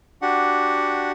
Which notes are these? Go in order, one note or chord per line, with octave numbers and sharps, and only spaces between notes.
D4 F#4 G4 F#5